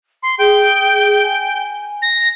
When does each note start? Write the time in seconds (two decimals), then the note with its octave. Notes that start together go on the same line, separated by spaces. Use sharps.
0.23 C6
0.39 G#4 G5
1.23 G#5
2.02 A#6